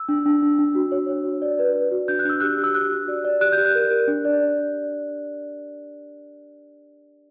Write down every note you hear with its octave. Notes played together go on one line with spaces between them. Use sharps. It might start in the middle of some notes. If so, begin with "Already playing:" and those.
Already playing: E6
D4
D4
D4
D4
F#4
C#5
C#5
F#4
D5
B4
B4
F#4
D4 G6
F#6
D4 E6
G4 F#6
G4
E6
F#4 F#6
F#4
D5
D5
G4 F#6
G6
G4
F#6
A#4
G4
D4
D5